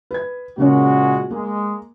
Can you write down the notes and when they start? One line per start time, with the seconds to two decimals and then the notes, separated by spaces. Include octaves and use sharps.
0.11 B4 G#6
0.58 A#2 C#3 G#3 A#3 C#4 F#4
1.30 G#3 A#3